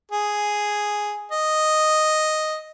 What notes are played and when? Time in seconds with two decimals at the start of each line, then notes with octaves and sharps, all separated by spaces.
0.11 G#4
1.32 D#5